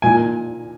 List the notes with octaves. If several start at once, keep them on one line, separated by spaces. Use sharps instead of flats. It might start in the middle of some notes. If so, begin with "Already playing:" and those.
A#2 G#5